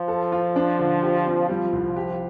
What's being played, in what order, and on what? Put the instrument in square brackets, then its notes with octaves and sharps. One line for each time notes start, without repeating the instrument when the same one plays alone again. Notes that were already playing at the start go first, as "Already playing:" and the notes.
Already playing: [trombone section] F3
[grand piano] A4
F4
D4
D3
G4
C4
[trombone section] F3 [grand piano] G3
[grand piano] C2
G4